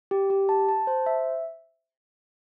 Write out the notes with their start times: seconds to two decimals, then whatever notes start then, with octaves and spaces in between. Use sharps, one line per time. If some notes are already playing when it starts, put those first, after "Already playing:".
0.11 G4
0.30 G4
0.49 A5
0.69 A5
0.87 C5
1.06 E5